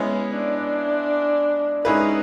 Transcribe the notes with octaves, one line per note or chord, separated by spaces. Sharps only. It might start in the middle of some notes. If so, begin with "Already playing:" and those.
Already playing: G#3 B3 C#4 E4
D4
G#3 C#4 D#4 E4 G#4 B4